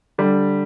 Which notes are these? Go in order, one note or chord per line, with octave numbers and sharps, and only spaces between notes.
D3 G3